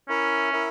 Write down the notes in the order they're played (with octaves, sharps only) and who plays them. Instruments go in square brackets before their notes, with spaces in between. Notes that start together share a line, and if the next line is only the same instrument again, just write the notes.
[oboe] C#4 [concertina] E4 A#4 E5
[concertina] E4 A#4 E5